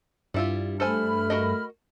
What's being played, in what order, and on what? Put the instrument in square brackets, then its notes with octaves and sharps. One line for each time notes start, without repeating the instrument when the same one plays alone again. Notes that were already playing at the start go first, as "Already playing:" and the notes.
[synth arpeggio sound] G2 [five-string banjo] G3 E4 F4
[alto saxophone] A3 [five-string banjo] A4 C5 G#5 [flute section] B5 F6
[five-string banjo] F#4 A#4 D#5